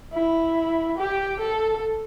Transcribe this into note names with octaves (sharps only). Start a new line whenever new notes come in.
E4
G4
A4